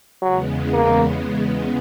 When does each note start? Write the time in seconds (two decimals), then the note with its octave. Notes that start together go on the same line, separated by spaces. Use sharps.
0.22 E2 C#3 F#3 G#3 B3
0.73 A#3